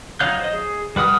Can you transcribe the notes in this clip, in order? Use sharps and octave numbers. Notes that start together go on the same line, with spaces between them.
F#3 D#4 C#5 F5 G6
C5 D#5
G#4
G3 B4 F#5 D#6 F6